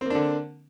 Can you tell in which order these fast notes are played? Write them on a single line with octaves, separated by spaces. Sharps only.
C4 A#3 D4 D3